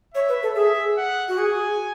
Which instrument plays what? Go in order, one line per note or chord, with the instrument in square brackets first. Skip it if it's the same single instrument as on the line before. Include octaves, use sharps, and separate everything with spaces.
[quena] C#5 [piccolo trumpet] E5
[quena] B4
A4
[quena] G#4 [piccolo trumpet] E5
[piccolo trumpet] F#5
[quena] F#4
[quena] G#4 [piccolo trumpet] G#5